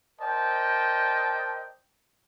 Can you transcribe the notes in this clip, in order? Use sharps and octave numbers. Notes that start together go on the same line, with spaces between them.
A#4 C5 D5 D#5 G5 A5